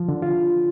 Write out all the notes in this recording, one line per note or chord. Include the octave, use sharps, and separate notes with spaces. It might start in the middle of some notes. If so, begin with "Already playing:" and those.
Already playing: F3
D3
F4